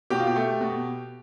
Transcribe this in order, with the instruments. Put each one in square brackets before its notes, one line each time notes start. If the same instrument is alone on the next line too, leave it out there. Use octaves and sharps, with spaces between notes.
[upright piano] B2 G4
F4
G4
A3
B2